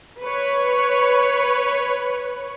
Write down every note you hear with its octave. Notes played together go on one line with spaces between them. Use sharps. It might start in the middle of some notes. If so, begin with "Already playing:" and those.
B4 C#5